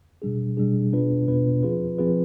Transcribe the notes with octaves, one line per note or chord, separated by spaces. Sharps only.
B2 G3 D4 G#4
B2 G3 D4 G#4
B2 B3 D4 F4 B4
B2 B3 D4 F4 B4
F3 C4 F4 G#4 B4
F3 C4 F4 G#4 B4